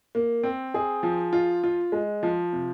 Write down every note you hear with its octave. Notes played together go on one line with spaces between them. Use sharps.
A#3
C4
G#4
F3
F4
F4
G#3
F3
C3